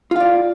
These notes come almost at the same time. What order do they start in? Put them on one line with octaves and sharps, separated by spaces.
F4 F5 D5